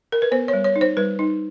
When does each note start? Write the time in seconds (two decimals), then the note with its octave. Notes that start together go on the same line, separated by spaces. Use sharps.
0.12 A#4
0.22 B4
0.32 B3 C5
0.48 C#5
0.53 G3
0.64 C#5
0.76 D#4
0.81 C5
0.97 G3 B4
1.19 D#4